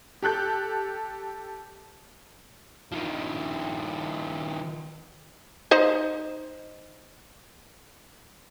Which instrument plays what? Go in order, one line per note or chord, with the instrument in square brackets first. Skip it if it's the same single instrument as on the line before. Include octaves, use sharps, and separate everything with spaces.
[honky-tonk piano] G4 A4 F#6 G6
[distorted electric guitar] D#3 F3
[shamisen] D#4 C5 D#5